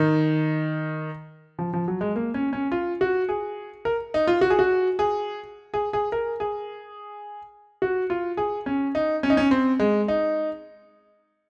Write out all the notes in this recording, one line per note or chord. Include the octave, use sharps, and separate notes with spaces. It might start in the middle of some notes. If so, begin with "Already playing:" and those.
Already playing: D#3
F3
F3
F#3
G#3
A#3
C#4
C#4
F4
F#4
G#4
A#4
D#4
F4
F#4
G#4
F#4
G#4
G#4
G#4
A#4
G#4
F#4
F4
G#4
C#4
D#4
C#4
D#4
C#4
C4
G#3
D#4